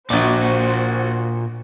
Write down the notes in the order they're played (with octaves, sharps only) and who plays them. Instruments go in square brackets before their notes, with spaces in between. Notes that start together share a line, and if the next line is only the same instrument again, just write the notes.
[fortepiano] A#1 D6 [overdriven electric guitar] A#2 D5 [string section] F#4 C5